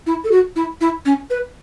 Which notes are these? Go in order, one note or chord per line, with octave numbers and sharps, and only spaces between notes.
E4
A4
F#4
E4
E4
C#4
B4